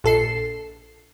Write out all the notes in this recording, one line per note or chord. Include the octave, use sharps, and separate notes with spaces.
A#1 A4 C7